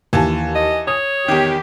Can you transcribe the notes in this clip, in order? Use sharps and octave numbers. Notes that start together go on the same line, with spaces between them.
D#2 E3 G#5 A5
D#5
C#5 D#6
E2 D#3 G4